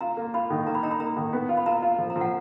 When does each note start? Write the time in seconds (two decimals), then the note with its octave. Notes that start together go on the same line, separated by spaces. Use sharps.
0.01 F4 A#5
0.17 A#3
0.34 F4 B5
0.50 D#3
0.67 A#3 A#5
0.75 B5
0.83 D#4 A#5
0.91 B5
1.00 A#3 A#5
1.17 D#3
1.33 B3
1.49 F4
1.57 B5
1.66 F4 A#5
1.82 F4
1.99 F3
2.10 A#5
2.16 F3
2.21 F#5